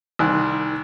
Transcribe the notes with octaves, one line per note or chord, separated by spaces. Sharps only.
C2 D#3 G#5 F#6